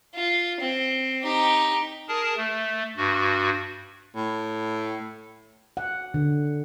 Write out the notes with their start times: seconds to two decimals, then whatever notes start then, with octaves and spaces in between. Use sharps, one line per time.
0.15 F4
0.60 C4
1.23 D#4 G4
2.08 G#4 A#4 A5
2.37 A3
2.97 G2 F#4
4.15 A2
5.77 F#5
6.14 D3